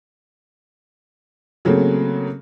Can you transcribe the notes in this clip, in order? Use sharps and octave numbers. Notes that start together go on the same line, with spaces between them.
C#3 F#3 A3 A#3 C4